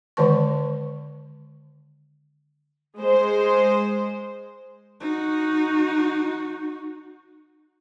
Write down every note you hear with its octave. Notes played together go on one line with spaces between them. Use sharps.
D3 D#3 G#3 B4 A5 C#6
G#3 C5
D#4 F#4